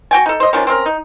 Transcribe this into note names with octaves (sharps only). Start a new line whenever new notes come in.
F#4 G5 G#5
D#4 A4
C5 D#5
D#3 F3 C#4 D4
C4 C#4 A#4
D#4